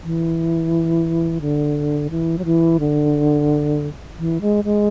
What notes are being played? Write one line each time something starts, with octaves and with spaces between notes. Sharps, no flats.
E3
D3
E3
F#3
E3
D3
E3
G#3
G#3